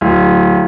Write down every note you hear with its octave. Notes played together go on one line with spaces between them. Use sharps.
D1